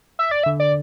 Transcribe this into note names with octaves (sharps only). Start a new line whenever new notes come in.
E5
D5
E5
D3
D5